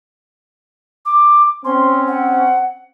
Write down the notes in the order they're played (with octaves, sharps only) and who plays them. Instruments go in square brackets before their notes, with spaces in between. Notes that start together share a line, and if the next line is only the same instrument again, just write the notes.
[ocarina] D6
[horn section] C4 C#4 [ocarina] C6
[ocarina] F#5